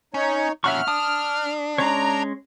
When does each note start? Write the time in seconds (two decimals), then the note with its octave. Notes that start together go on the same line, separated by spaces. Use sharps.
0.14 C#4 D#4 C#5
0.64 A#2 C#4 E5 F#5 C#6 F6
0.88 D4 D#6
1.78 G#3 C#4 C#5 A#5